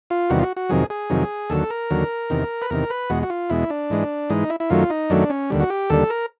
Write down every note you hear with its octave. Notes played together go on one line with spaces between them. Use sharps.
F4
E2 C3 D#3 G3 F#4
F4
F#4
F#4
F2 C3 D#3 F#3 G#4
G#4
F2 C3 D#3 F#3
D#2 D3 F#3 A4
A#4
D#2 D3 F#3
E2 C3 D#3
B4
E2 C3 D#3 A#4
B4
E2 B2 G#3 F#4
F#4
F4
E2 B2 G#3 E4
D4
G#2 E3 G#3
G#2 E3 G#3 D#4
E4
E4
F#2 D#3 F#3 A3 F4
D#4
F#2 D#3 F#3 A3 D4
C#4
D#2 D3 G3
F#4
G4
D#2 D3 G3 A4
A#4